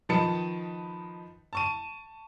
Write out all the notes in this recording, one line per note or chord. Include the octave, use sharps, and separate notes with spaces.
D#3 F3 D#4 B4 A5 C#7
A5 C#6 D#7